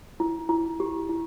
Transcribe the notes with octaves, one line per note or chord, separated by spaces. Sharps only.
E4
E4
G4
E4